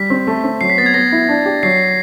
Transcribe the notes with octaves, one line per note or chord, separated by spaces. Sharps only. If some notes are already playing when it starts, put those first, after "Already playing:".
Already playing: G3 B6
C4
A3
C4
F#3 C7
B6
B3 A6
G#6
B3 A#6
E4
D4
G4
F#3 C7